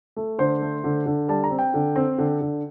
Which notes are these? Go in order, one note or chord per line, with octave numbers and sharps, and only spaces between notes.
A3
D3 C5
A3
D3
D3
G3 A5
A#5
C4
G5
D3
C4
D3
D3